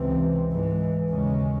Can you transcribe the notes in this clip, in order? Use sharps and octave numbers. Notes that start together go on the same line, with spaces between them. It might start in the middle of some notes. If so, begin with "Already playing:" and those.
Already playing: C#2 C3 E3 C4
G#2 E3 G#3
D#2 C#3 G#3 C#4